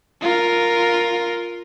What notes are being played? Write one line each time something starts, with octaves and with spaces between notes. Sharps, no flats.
F4 A#4